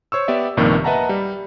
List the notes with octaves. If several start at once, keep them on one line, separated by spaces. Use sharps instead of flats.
C5 C#5 C#6 E6
B3 G4 D5 E5
A#1 G2 C3 D#3 A#3
B4 D#5 E5 F#5 A5 A#5
G3